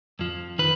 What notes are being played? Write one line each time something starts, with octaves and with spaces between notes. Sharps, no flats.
F2 F3
D#3 B4